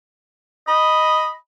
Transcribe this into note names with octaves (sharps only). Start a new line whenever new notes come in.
D#5 B5